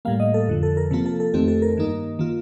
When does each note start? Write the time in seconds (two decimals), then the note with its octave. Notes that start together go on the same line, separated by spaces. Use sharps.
0.05 A2 G3 A#3 F5
0.20 D#5
0.34 A4
0.48 F2 D3 F3
0.63 A4
0.77 A#4
0.91 C3 F3 A#3 F4 A4
1.06 A4
1.20 A4
1.34 F2 D#3 A3 C4 G4
1.48 A4
1.62 A#4
1.77 G2 D#3 A#3 D#4
2.19 D#3 A#3 F4